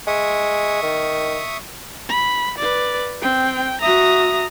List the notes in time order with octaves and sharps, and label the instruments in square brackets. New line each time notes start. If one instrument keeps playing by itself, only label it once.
[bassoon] G#3 [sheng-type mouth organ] E5 C#6 D#6
[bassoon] D#3
[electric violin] B5
B4 D5
[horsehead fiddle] C4 [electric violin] G5
[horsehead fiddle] F#4 E5 [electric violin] A#5 D#6